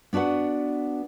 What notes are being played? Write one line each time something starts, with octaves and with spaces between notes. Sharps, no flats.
B3 D4 F#4 B4 F#5